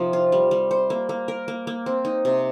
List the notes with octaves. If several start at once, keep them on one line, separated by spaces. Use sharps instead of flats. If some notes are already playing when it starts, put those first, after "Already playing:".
Already playing: C3 F3 D#4
F4
G3
G3
C5
A#3
A#3
A#4
A#3
A#3
C4
D#4
C3